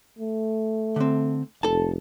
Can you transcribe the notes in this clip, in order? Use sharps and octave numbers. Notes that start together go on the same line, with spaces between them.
A3
D3 C4
F1 A4 A5